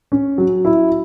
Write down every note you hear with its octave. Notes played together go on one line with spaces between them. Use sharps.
C#4
F#3
E4